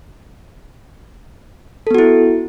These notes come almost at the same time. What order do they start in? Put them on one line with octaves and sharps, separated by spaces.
A4 B3 F#4 E4